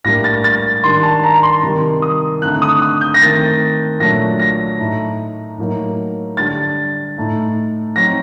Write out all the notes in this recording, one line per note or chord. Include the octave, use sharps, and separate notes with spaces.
A2 G3 A#3 D4 A#6
A6
A6
D#3 G3 D4 C6
A5
A#5
C6
C3 D#3 G3
D#6
D3 A3 C4 D#4 F#6
D#6
D#6
G6
A#6
D#3 A3 C4 A6
A#2 F#3 A3 D4 A#6
A#6
A2 A3 D#4
A2 F#3 A#3 D#4
D3 G3 D4 A6
A2 A3 D#4
F#3 C4 D#4 A#6